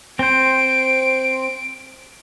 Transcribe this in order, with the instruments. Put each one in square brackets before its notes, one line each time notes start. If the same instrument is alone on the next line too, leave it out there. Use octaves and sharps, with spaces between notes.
[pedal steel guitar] C4 C5 [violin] D7